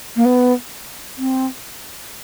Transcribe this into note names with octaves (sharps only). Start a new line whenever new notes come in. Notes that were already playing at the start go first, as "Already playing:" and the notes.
A#3
B3
C4